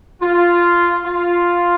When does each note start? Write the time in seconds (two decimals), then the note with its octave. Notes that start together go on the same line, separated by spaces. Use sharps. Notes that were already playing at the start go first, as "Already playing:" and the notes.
0.21 F4
1.04 F4